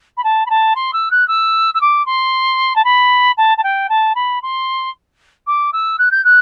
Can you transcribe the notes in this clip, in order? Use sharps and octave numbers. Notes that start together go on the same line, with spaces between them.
B5
A5
B5
A5
C6
E6
F#6
E6
E6
D6
C6
A5
B5
A5
A5
G5
A5
B5
C6
D6
E6
F#6
G6
F#6